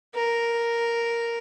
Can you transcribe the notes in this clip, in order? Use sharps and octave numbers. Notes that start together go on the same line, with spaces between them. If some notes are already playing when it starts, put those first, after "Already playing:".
A#4